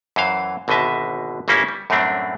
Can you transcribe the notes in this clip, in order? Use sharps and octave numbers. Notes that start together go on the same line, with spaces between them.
F#2 E3 C5 F5
G#1 B2 D3 D#5 E5 A5
G1 C#3 G3 A#3 C#4 E4
G3
F#2 A2 G3 A3 C4 D4